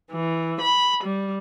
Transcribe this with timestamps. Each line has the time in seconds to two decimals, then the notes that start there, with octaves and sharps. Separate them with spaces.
0.13 E3
0.60 B5
1.03 G3